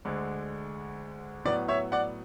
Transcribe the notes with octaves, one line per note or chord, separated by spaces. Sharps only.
D2 D3 G#3
A2 F#3 B3 D5
C#5 E5
D5 F#5